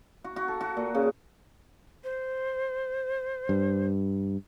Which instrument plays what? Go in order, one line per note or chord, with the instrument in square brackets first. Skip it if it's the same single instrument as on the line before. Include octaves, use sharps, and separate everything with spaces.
[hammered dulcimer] F#4
F#4
A4
F#4
A#2
C#3
[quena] C5
[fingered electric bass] G2